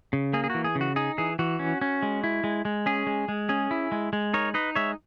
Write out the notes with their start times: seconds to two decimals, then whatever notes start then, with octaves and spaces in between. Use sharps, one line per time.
0.13 C#3
0.33 A#3 G#4
0.44 G#4
0.50 E3 F#4
0.64 G#4
0.75 C#3
0.81 F#4
0.96 D#4 G#4
1.18 E3 G#4
1.39 E3 F#4
1.59 C#4
1.81 C#4
2.03 G#3
2.24 E4
2.44 G#3
2.65 G#3
2.86 C#4 G#4
3.07 G#3
3.29 G#3
3.49 C#4 G#4
3.71 E4
3.92 G#3
4.13 G#3
4.34 D#4 A#4 C#5
4.54 D#4 B4 D#5
4.75 G#3 C#5 E5